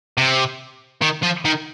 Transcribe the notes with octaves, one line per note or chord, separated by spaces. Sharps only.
C3
D#3
F3
D#3